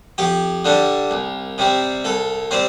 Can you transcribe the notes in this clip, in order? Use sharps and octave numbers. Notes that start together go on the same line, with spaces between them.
F2 G4
D3 G3 D4
C2
C3 G3 C4
C2 A4
C3 G3 C4 C5